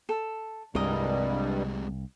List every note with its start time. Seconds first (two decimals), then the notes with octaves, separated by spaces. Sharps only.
0.09 A4
0.75 C2 G2 C3 G3 G#3 A#4 D#5